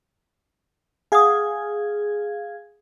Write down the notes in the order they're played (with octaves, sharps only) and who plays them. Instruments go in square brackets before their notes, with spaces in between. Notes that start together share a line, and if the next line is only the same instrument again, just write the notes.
[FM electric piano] G#4 F5 G#6 [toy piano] F#5 D#6